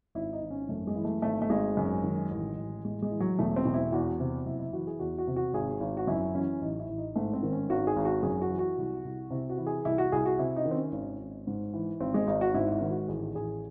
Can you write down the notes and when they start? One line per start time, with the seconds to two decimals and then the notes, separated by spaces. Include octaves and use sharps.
0.15 G#1 E4
0.33 D#4
0.42 G#1
0.50 C#4
0.69 F#2 A3
0.87 G#3
0.96 E3
1.05 A3
1.22 G#1 A3
1.42 A3
1.49 G#1 G#3
1.77 F#2
2.04 D#3
2.31 A1
2.58 A1
2.85 A2 G#3
3.02 G#3
3.11 E3
3.20 F#3
3.39 E1 A3
3.56 C4
3.65 E1
3.74 E4
3.92 E2 F#4
4.20 C3
4.46 F#1 E4
4.59 E4
4.73 E3 F#4
4.87 G#4
4.99 E2 F#4
5.18 F#4
5.27 C3
5.36 F#4
5.53 G#1 G#4
5.80 G#1
5.97 F#4
6.07 F#2 E4
6.35 E3 C#4
6.62 A1 D#4
6.80 E4
6.89 A1
6.98 D#4
7.16 G#2 A3
7.33 C4
7.43 D#3
7.52 C#4
7.70 G#1 F#4
7.87 G#4
7.96 G#1
8.05 F#4
8.23 F#2 G#4
8.42 F#4
8.50 E3
8.59 F#4
8.78 C2
9.05 C2
9.31 C3 E4
9.50 F#4
9.57 E3
9.67 G#4
9.85 C2 E4
9.98 F#4
10.12 C2 G#4
10.26 F#4
10.39 C3 E4
10.56 D#4
10.66 D#3
10.71 C4
10.74 C#4
10.92 G#1
11.19 G#1
11.47 G#2
11.74 E3
12.00 G#1 C4
12.14 G#3
12.27 G#1 D#4
12.41 F#4
12.54 G#2 E4
12.72 E4
12.81 D#3
12.90 F#4
13.08 A1 G#4
13.35 A1 G#4